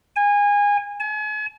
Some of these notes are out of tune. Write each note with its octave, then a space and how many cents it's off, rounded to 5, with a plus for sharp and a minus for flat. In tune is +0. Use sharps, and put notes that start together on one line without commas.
G#5 -25
G#5 +40